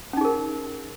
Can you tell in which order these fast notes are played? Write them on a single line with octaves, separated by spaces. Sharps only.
C#4 D#4 G#4 A#4